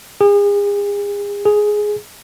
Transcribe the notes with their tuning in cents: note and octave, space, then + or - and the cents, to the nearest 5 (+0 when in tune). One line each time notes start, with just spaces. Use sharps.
G#4 -40
G#4 +5